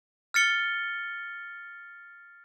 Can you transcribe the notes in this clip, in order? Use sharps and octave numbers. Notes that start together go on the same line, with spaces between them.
F6 A6 C#7 G7